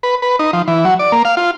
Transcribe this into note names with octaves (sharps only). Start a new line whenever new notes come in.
B4
B4
D#4
F3
E3
F#3
D5
A#3
F5
F4